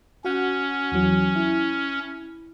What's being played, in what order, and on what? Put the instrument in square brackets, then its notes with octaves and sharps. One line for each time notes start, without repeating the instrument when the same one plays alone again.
[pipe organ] C#4 [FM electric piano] F#4 F#5
[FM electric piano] E2 E3 F#3
E4